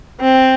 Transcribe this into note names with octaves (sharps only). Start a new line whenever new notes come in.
C4